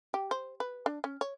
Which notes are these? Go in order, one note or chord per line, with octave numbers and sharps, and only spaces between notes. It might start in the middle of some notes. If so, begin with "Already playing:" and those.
G4
C5
B4
D4
C#4
C#5